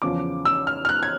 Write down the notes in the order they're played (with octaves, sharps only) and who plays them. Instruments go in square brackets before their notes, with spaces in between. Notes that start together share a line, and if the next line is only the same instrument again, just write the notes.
[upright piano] E2 C#3 F3 D6
E6
F6
F6
F#6
G#6